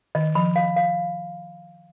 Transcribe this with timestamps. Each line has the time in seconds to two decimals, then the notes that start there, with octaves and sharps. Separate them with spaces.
0.15 D#3 D#5
0.35 F3 B5
0.56 F5
0.76 F5